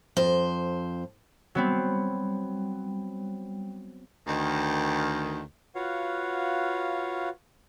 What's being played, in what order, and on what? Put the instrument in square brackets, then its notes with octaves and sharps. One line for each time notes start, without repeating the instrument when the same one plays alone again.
[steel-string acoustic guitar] F2 C5
[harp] F#3 B3 C4 [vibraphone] G3 G5
[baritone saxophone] D2 [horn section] D#3
[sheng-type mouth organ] F4 F#4 B4 C#5 F5 F#5